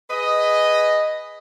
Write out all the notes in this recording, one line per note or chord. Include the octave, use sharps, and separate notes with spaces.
G#4 B4 D#5